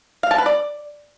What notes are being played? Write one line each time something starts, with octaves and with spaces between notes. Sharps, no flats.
F5
A5
B4
D5